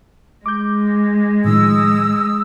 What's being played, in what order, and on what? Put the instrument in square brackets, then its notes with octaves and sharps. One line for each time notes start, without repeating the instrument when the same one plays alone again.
[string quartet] G#3 [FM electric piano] D6 G6
[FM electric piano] A2 D#3 F3 [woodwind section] D#6 E6